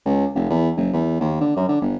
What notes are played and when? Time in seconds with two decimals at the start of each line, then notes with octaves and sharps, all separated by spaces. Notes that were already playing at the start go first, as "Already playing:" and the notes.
0.06 C#2
0.35 F1
0.50 E2
0.77 F#1
0.93 E2
1.21 D#2
1.41 D3
1.56 F#2
1.69 D3
1.82 G1